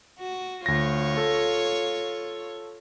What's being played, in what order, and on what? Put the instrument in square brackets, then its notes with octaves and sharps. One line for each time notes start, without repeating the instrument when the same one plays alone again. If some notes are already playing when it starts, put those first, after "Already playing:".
[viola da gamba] F#4
[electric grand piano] D2 A#6 [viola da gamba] F4 C#5
[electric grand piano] A4